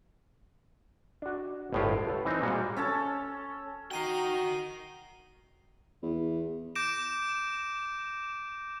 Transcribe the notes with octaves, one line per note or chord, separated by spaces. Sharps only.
D4 F#4
G1 C2 A2 G#3 F4 G4
A4 B4 C#5
E3 C4 D#4 C5
A#2 G3 G#3 F#4
C#4 A4 C#5 A5
D#4 F#4 A#4 G5 C7 D#7 G7
E2
D6 G6 A#6 D7 E7